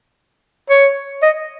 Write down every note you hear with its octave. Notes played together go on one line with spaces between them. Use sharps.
C#5
D#5